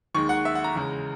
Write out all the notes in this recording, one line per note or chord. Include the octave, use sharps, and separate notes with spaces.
D#2 D#3 G#3 C#6
F#5
E5
F#5
A#5
E2 C#3 G#3